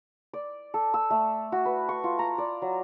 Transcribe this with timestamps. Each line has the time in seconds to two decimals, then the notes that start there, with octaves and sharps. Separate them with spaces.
0.33 D5
0.74 A4
0.94 E6
1.10 A3
1.52 F#4
1.65 B4
1.89 C#6
2.04 F4
2.19 A#5
2.38 D5
2.62 F#3